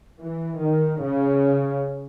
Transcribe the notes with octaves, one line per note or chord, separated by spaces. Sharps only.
E3
D#3
C#3